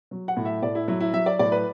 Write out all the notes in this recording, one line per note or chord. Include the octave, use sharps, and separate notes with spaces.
F#3
F#5
A2
E5
A2 D5
E4
F#3 E4
E4
F#3 E5
D5
A2 D5
B4